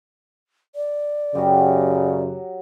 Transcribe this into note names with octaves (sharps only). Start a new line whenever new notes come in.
D5
F#2 C#3 F#4 G4
F#3